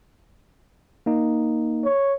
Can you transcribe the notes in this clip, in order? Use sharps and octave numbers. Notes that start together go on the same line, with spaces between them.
A#3 D#4
C#5